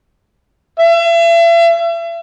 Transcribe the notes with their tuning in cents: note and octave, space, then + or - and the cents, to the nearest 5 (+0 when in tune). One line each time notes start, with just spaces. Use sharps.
E5 +40